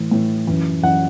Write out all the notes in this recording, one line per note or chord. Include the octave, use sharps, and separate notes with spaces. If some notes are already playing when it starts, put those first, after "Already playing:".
Already playing: A2 E3
A2 E3
F#2 E3
F#2 E3 F#5